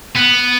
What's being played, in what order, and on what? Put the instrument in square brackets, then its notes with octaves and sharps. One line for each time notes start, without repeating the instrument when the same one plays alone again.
[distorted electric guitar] B3